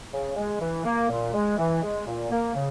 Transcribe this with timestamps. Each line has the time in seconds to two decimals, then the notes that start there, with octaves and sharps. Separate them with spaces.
0.13 C#3
0.36 G#3
0.61 E3
0.85 A#3
1.10 A#2
1.34 G#3
1.58 E3
1.83 G#3
2.07 A#2
2.31 A#3
2.55 C#3